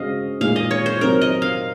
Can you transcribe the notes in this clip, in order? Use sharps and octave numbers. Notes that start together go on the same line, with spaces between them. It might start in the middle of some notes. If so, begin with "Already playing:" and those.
Already playing: C#3 G#3 C#4 F#4 C5 D#5 F5
A#2 G#3 D#4 G#4 F5
D#5
C#5
C5
C3 F#3 C4 D#4 A#4
D#5
F5